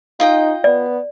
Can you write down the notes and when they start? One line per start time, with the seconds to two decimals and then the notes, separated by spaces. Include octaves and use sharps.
0.20 D#4 F4 D#5 G5
0.64 B3 D5